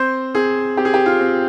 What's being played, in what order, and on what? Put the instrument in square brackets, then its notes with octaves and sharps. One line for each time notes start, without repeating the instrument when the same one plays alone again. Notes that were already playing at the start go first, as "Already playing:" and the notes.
Already playing: [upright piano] C4 C5
C4 G#4
C4 G4
G#4
G4
F4
C4